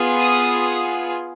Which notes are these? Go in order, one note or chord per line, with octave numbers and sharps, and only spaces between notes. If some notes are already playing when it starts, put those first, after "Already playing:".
Already playing: B3 F4 G#4
D#6